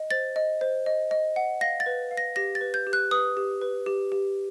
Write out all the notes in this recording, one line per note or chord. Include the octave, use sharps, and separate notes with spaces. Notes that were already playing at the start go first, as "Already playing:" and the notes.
Already playing: D#5
C5 A6
D#5
C5
D#5
D#5
F#5
F5 A#6
A6
B4
F5
A#6
G4 A#6
A6
B4
G6
G4
F#6
B4 D#6
G4
B4
G4
G4